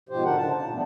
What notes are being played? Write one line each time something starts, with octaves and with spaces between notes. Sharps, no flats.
G#2 B2 F3 G4 C5
G#2 D3 D4 A#4 F#5
C#3 D4 A5
A#2 A5
E3 G3 A3 B3 D4